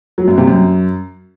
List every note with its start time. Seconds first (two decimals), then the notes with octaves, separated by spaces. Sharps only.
0.18 F#3
0.28 F#2
0.38 C3
0.47 F#2